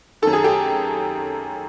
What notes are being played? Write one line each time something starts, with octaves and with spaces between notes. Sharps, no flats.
F#2 D#3 A4
G#4
G4 A4